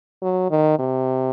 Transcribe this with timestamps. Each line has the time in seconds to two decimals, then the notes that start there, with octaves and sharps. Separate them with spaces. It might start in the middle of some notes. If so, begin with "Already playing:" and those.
0.22 F#3
0.50 D#3
0.79 C3